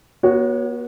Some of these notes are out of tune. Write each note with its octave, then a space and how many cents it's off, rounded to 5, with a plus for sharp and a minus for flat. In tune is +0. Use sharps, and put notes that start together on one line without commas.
B3 -45 F#4 +0 C#5 +0